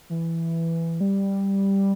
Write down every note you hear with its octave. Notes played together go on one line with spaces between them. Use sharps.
E3
G3